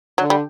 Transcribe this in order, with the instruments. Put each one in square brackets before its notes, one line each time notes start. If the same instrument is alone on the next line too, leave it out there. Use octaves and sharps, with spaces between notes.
[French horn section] D3 [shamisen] F#3
[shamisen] G3